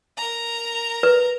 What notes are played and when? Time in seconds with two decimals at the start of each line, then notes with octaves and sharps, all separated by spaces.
0.17 A#4 A#5
1.03 B4